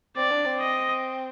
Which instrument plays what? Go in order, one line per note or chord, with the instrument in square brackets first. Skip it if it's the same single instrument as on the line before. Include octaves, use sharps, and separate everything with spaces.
[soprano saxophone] C4 [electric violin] D5
[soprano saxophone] D4
C4
[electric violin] D#5